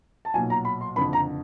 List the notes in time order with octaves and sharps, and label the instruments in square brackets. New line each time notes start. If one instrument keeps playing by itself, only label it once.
[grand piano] A5
[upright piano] B1 A#2 F#3 [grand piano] G#5
[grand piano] A#5
B5
C6
[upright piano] F#1 F2 D3 [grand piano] B5
[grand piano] A#5